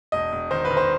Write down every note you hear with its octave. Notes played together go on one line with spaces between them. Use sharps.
E1 D#5
E1
D#3 C5
B4
D#3
C5